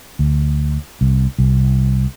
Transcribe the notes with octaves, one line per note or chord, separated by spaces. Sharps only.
D2
C2
C2